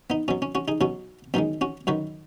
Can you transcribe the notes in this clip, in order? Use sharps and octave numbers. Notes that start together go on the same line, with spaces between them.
B3 D#4
B2 F#3 C#4
C#4
C#4 F#4
D#4 G#4
B2 F#3 C#4 F#4
F#2 D#3 G#3 B3 D#4
C#4 F#4
F#2 D#3 F#3 F#4 B4